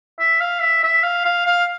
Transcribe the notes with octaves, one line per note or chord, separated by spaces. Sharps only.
E5
F5
E5
E5
F5
F5
F5